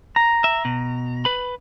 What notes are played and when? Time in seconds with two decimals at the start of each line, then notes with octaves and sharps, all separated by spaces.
0.16 A#5
0.44 E5
0.65 B2
1.25 B4 B5